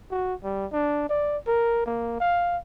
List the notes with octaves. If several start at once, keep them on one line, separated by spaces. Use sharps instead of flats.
F#4
G3
D4
D5
A#4
A#3
F5